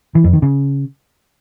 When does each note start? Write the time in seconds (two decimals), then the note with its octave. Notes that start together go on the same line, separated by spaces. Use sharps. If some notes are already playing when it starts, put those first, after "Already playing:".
0.15 E3
0.24 F2
0.33 D#3
0.42 C#3